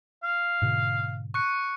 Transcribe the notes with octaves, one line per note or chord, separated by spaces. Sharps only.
F5
G#2 B2 D3
C#6 F#6 C#7